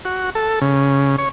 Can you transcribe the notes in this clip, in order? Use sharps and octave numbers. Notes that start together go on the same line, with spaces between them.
F#4
A4
C#3
C#5